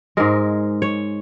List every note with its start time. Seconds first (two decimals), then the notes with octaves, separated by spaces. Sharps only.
0.17 G#2 G#3 A#4
0.82 C#5